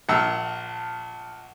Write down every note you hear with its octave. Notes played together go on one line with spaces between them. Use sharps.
A#1 F#5 A5 E6 F6